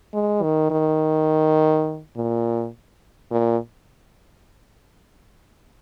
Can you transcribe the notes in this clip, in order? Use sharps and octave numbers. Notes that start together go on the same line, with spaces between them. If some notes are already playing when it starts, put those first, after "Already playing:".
G#3
D#3
D#3
A#2
A#2